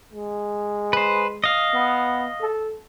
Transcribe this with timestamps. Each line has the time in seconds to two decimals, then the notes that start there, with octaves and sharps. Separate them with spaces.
0.13 G#3
0.93 B4 C5
1.44 D#5 F5
1.74 B3
2.41 A4